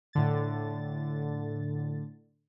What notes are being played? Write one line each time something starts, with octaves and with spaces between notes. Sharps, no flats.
A2 D3 A6